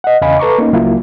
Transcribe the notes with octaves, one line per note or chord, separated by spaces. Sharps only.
D#5 F#5
E2 C#3 D#5 F5 G#5 B5
A4 B4 A#5 C#6 D6
A#3 C#4 D#4
C#2 F#3 A#3 E4 F4